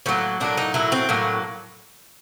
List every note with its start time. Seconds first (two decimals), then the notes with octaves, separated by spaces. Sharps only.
0.06 A2 F#3 A#3 C#4
0.40 A2 F#3 A#3 D4
0.57 D#4
0.74 A2 F#3 A#3 E4
0.92 C4
1.09 A2 F#3 A#3